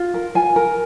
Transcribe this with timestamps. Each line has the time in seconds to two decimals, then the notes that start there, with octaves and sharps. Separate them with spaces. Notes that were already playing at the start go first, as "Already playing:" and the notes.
Already playing: F4
0.14 A#4
0.35 F4 G#5
0.56 A#4